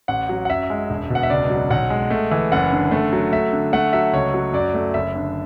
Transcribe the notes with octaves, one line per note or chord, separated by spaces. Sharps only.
A1 F#5
F#3
F#5
F#2 E5
G#3
E1
B2 F#5
E5
C#2 D5
F#3
B1 F#5
G#3
A3
E3
F#1 F#5
D3
A3
F#3
A3 E5
D3
A3 F#5
F#3 E5
C#2 C#5
F#3
F#2 D5
A3
F#1 E5
D3